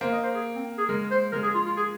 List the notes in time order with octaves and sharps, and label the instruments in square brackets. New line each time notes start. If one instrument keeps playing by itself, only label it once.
[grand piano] A#3 [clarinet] C5
[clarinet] D#5
C5
G#4
C4
G#4
[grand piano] G#3 [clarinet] A#4
[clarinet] C5
[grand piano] G#3 [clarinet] A#4
[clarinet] G#4
F4
F4
G#4